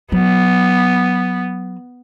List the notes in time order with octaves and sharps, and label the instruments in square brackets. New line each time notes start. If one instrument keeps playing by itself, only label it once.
[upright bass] F#3 [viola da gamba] B3